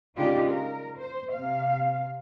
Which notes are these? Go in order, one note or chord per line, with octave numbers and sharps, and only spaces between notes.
C#3 G#3 D4 D#4 F4 G4
A#4
C5
C3 F5